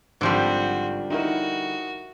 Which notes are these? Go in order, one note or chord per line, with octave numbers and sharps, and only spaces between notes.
G#1 D3 F3 G3 F#4 C5
D#4 E4 F#4 A#4